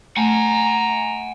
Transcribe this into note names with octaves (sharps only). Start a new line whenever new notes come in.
A3 F#5 G#5 A#5